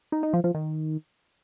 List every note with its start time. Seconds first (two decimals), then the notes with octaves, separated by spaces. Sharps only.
0.12 D#4
0.23 D#4
0.33 F3
0.44 F3
0.54 D#3